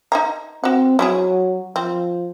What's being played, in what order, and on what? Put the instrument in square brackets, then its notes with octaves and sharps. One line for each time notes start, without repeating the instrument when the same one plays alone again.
[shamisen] D#4 G#5 A#5
[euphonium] C4 [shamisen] F#4 F#5
[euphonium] F#3 [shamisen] C#4 E4 G#4
[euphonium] F3 [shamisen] C4